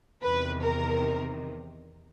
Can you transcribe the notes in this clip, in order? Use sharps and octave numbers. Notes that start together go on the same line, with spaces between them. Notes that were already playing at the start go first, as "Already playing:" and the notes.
E2 C3 D#3 B4
A#4